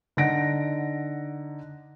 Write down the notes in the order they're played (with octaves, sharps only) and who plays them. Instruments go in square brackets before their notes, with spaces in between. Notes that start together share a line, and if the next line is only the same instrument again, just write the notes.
[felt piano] D3 D#4 F#5 A#6 D7